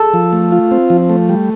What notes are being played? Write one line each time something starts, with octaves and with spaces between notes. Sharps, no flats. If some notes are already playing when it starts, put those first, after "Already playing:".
Already playing: A4
F3
A3
F4
C4
F3
A3
G3